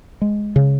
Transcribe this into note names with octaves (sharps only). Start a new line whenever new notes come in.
G#3
C#3